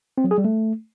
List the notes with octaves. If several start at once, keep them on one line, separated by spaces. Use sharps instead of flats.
C4
F#3
G#4
G3
A3